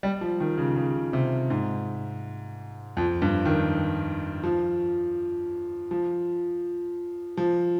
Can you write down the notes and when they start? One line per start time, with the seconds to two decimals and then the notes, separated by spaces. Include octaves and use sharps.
0.03 G3
0.21 F3
0.40 D#3
0.57 C#3
0.76 C#3
1.13 C3
1.50 G#2
2.97 F2
3.22 G2
3.45 D#3
4.43 F3
5.91 F3
7.37 F3